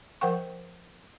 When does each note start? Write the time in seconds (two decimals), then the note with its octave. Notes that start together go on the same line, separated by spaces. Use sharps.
0.21 F3 A#4 C5 F#5 G5 C#6